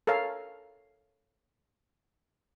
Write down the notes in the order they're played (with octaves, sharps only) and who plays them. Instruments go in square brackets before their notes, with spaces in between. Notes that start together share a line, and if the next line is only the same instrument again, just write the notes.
[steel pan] A4 A#4 C#5 F5